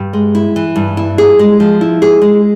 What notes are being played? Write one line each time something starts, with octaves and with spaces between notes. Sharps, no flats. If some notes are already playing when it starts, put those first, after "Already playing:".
Already playing: G2
G#3
E4
E3
G2
E4
G#4
G#3
F3
E4
G#4
G#3